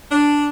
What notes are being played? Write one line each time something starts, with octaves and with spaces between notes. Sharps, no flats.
D4